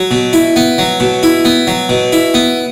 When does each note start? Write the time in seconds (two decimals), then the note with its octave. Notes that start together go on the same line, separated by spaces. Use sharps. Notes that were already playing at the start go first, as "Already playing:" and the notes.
Already playing: F#3
0.11 B2
0.33 E4
0.56 B3
0.78 F#3
1.00 B2
1.23 E4
1.45 B3
1.67 F#3
1.89 B2
2.12 E4
2.34 B3